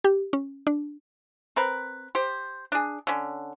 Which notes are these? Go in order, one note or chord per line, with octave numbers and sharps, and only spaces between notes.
G4
C#4
D4
C4 A#4 B4
G4 C5
D4 G#4
D3 C#4